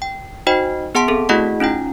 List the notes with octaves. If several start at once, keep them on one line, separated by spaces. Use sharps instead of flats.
G5
D#4 F#4 C5 D#5 G5
B3 G#4 F#5 A5 C6 D7
C4 G#4 A4
A3 E4 F#4 G#4 D#5 F#5
C#4 D#4 F4 G5